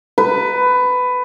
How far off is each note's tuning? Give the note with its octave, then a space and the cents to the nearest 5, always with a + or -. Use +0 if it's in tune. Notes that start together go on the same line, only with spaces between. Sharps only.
B4 +15